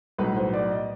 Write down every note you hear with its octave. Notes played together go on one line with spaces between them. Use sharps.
B1 A2 F#3 B4
C5
D5
D#5